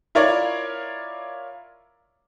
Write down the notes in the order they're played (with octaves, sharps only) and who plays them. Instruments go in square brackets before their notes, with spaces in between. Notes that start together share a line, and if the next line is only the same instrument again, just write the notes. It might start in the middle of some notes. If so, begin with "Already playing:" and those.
[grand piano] E4 F4 A#4 C#5 D5